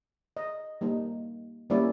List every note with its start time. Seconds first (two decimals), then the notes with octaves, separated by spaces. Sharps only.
0.37 D#5
0.81 G3 A#3 D#4
1.70 G3 A#3 C#4 E4 D5